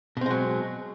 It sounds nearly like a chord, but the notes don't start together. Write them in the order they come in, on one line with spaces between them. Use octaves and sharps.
B2 C4 G#3 F#3